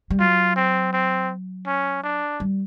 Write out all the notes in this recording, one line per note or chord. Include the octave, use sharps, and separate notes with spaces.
G3
F#3 F4
C4
C4
C#4
D4
G3